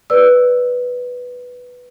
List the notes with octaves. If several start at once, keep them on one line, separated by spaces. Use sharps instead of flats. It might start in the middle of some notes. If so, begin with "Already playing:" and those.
B4 D5 E6